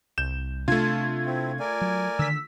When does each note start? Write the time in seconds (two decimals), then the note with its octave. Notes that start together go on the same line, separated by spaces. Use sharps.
0.18 C2 G6 E7
0.68 C3 A3 D4 F4 A5 G#6
1.26 C4 E4
1.60 A#4 D5 G#5
1.81 F#3
2.19 D3 D#3 E6 B6